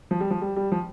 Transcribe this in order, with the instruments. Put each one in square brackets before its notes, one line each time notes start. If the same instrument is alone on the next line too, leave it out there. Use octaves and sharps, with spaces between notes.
[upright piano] F3
G3
F3
G3
G3
F3